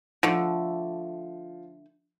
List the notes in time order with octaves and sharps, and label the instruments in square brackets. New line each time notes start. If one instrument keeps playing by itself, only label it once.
[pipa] D3 A3 [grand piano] F3